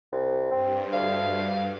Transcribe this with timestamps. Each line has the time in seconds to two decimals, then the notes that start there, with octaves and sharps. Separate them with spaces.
0.12 C2
0.51 G2 C4
0.93 D2 F5